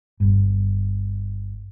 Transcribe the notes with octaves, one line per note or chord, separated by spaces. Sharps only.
G1 G2